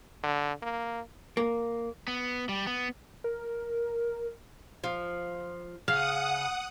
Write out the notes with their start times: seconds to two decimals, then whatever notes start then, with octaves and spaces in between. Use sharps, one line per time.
0.23 D3
0.62 A#3
1.37 A#3
2.08 B3
2.49 G3
2.67 B3
3.24 A#4
4.84 F3
5.88 C#3 F5 F#5 D#6